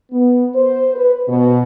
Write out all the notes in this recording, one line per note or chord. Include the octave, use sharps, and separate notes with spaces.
B3
C5
B4
B2